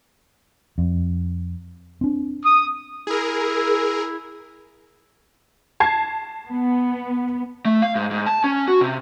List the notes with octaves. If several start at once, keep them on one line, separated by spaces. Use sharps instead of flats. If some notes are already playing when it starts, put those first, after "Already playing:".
F2
C4 D4
D#6
E4 G#4 A#4
A5 G#6 C7
B3
A3
F5
G#2
G#2
A5
C#4
F#4
C3